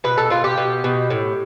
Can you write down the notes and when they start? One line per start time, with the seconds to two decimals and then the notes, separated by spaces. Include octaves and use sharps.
0.04 B2 B4
0.18 A4
0.30 B2 F4
0.44 G4
0.58 B2
0.84 B2
1.10 A2